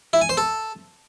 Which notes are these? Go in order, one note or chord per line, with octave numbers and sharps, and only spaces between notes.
E4
G#5
C5
A4